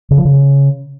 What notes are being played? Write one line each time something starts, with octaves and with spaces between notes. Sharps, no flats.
C#3
F3
C#3